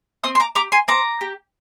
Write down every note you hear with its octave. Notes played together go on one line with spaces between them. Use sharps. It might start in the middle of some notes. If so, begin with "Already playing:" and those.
C4 C6 D#6
C6
A#5 D6
G4 A#5 D6
G#5 C6
C4 A#5 D6
G4